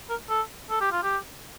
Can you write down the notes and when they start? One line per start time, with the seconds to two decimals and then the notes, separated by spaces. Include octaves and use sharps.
0.09 A#4
0.29 A4
0.70 A4
0.81 G4
0.92 F4
1.03 G4